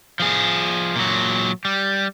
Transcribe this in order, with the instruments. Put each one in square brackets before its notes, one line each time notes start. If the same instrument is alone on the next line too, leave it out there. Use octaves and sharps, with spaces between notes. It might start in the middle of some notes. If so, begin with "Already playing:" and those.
[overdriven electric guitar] F3 G#4
A#2 F#3
G3